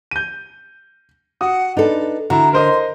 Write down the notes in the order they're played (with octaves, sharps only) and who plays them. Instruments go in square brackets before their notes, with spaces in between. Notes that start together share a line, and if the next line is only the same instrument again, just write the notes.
[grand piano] G6 D#7
[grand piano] F#4 D#6 [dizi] F#5
[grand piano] D4 [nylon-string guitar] D#4 A4 [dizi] B4
[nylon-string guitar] D3 [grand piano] E4 F#4 [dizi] A#5
[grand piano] A#4 C5 D#5 [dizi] C6